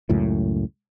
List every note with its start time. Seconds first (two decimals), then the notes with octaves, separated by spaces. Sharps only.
0.10 C#2 F#2 A2